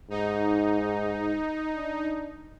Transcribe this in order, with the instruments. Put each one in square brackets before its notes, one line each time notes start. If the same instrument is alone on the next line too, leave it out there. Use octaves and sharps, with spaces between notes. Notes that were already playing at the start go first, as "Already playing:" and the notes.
[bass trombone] G#2 [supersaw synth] D#4
[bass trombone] D4